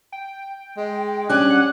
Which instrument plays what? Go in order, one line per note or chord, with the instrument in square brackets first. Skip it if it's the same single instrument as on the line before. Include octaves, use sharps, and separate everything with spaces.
[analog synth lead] G5
[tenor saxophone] G#3
[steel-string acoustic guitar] G3 C#4 [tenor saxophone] D4 [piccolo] F#6
[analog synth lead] F#5